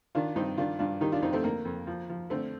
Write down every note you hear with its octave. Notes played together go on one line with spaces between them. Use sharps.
D#3 D4 F4
G2 C4 D#4
D#3 D4 F4
G2 D4 F4
D#3 D#4 G4
D4 F4
F2 C4 D#4
A3 C4
D3 A#3
F2
F3
F3
D3 A3 C4